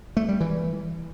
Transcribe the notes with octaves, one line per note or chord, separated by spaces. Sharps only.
A3
G3
E3